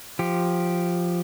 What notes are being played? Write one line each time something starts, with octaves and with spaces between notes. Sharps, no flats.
F3 G4